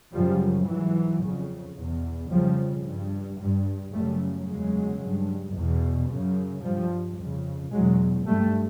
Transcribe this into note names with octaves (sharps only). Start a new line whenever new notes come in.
F#2 C#3 F3 G3
G#2 E3 F#3
F2 C#3
E2 B2
F2 C#3 F3 G3
G2
G2
F#2 C#3 G3 A3
E2 C#3 F#3 G#3
G2
E2 B2
F#2 C#3
G2 F3 G3
F2 C#3
E2 B2 F#3 G#3
G2 G3 A3